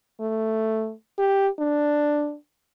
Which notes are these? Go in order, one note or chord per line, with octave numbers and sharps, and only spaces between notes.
A3
G4
D4